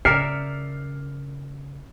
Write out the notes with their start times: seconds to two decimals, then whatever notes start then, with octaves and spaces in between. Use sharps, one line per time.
0.05 C#3 A#4 D5 E5 F6 C7 C#7